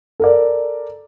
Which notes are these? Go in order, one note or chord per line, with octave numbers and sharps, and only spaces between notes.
A4 A#4 D5